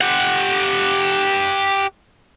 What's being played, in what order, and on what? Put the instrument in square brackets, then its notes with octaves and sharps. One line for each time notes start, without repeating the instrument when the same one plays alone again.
[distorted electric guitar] G4 F#5